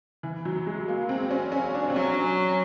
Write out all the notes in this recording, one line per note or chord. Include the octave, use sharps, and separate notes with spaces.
E3
F#3
G#3
A#3
C4
C#4
C#4
D4
C4
F#3 C#4